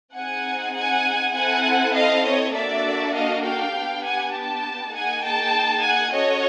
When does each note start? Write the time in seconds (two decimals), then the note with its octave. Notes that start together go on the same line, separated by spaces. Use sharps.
0.15 C4 D#4 G#4 F#5 G#5
0.75 F#5 G#5
1.34 C4 E4 A4 F#5 G#5
1.94 D#5 F5
2.24 C#5 D#5
2.54 A#3 D4 F#4 A4 D5 E5
3.13 D#5 F5
3.44 F5 G5
3.73 B3 D4 G4
4.03 F#5 G#5
4.33 G5 A5
4.93 A#3 D#4 G#4 F#5 G#5
5.22 G5 A5
5.82 F#5 G#5
6.12 C#4 F#4 A4 C#5 D#5